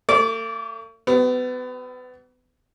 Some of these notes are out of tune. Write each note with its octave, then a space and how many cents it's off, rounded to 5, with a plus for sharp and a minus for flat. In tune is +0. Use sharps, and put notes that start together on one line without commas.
A3 +45 D5 -25
G3 -40 B3 +30